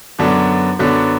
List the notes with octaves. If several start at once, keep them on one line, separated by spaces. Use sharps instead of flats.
F#2 D3 F#3 B3 D4
F#2 D3 F#3 B3 D4